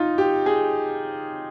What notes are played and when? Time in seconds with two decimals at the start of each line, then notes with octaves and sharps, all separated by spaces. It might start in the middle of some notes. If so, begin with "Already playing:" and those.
Already playing: D#4 F4
0.18 G4
0.46 G#4